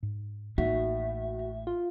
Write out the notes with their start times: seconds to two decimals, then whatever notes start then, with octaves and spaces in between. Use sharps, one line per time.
0.03 G#2
0.58 A1 A2 A#3 D#4 F#4 E5
1.67 F4